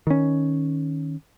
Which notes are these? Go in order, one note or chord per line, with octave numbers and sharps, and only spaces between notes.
D#3 C#4